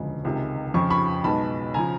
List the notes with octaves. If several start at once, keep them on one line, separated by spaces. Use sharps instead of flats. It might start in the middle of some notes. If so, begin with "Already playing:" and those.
Already playing: E1 D2 C#3 F3 G#3
C#2 C3 D#3 G#3
F2 C#3 F3 C#6
B5 C#6
B1 B2 G#3 A5 B5
C#3 F3 G#5 A#5